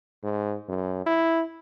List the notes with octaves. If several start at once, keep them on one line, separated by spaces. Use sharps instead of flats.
G#2
F#2
E4